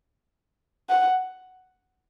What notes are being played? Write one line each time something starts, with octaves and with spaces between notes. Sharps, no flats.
F#5